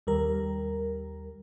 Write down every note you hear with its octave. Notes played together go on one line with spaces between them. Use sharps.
D#2 G3 A#4